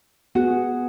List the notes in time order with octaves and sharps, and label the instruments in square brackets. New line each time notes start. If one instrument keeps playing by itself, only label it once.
[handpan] B3 G#4 [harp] F#4